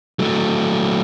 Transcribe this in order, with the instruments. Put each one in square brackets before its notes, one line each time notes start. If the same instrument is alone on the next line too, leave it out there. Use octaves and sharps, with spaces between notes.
[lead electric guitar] F#3 A3